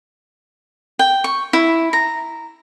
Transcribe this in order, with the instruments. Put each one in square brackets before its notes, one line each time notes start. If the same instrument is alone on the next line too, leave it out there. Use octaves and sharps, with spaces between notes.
[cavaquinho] G5
C#6
E4
A#5